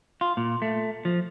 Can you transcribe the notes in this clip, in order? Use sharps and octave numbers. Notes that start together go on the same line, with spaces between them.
F4
A#2
A3
F3